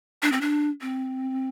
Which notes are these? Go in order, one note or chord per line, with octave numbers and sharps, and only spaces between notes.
D4
C4
D4
C4